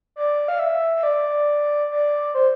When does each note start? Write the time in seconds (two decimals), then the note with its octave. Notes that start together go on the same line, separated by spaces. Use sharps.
0.16 D5
0.48 F5
0.59 E5
0.96 E5
1.03 D5
1.91 D5
2.34 C5